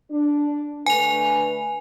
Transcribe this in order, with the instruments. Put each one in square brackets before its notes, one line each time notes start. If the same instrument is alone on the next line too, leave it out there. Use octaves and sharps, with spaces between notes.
[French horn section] D4
[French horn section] D3 A3 B4 [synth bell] G#5 F7